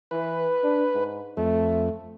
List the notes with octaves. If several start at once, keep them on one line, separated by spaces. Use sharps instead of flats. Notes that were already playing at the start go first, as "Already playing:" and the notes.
E3 B4
D4
G#2
F2 A3